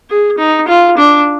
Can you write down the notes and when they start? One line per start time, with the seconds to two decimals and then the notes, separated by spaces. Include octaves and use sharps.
0.10 G#4
0.38 D#4
0.68 F4
0.97 D4